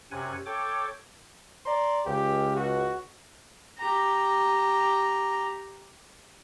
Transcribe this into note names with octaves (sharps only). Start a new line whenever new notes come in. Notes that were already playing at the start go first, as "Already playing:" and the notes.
F#2 C3 F#5 G#5
A4 C#5 G5 D6
D5 A#5 C6
C#2 G4
F#4
G4 A#5